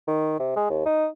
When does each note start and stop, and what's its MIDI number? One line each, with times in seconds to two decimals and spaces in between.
0.08 0.38 51
0.40 0.56 48
0.57 0.65 56
0.70 0.84 39
0.86 1.08 63